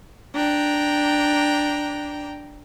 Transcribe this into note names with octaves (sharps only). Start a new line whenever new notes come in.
D4 G5 A#5